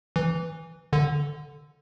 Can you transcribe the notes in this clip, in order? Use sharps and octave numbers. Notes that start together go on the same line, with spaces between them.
E3
D3